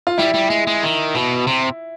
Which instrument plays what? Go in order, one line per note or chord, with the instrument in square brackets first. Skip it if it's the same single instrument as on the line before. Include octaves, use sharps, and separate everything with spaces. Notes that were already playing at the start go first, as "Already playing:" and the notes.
[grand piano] F4
[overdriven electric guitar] G3 [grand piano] E4
[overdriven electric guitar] G3
G#3
G#3
D#3
B2
C3